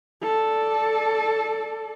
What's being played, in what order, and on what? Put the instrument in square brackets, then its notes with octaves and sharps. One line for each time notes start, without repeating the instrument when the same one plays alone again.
[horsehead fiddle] A4 D5